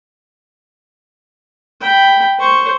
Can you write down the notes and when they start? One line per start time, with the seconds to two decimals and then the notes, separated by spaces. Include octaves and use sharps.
1.81 G5 B5
2.39 C5 C#6